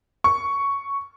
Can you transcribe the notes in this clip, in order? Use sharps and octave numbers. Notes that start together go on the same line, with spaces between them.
C#6